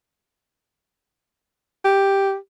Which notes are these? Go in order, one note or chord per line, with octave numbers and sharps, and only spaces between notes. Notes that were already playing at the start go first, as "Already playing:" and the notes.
G4